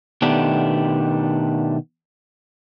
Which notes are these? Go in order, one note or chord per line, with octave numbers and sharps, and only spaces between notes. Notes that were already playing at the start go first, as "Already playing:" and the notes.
B2 D#3 A3 B3 D4 G4